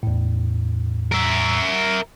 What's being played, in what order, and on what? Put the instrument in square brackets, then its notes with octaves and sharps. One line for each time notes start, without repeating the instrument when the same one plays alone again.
[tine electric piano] E2 A2
[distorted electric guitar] A#4 E5